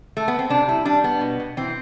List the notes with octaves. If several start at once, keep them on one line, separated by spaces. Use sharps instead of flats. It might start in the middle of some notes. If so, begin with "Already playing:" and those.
A3
B3
C4
C3 D4
G3 E4
G3 D4
G3 B3
B2
B2
E3 C4